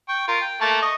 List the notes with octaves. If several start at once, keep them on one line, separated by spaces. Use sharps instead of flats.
G5 C#6
F4 A#4
G5
A3 A#3 A5
D#5 C#6